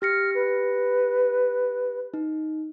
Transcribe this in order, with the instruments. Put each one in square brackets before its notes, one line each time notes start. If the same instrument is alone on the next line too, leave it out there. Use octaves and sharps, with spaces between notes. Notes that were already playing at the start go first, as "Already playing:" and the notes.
[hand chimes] G4 A#6 C#7 [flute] F6
[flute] B4
[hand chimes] D#4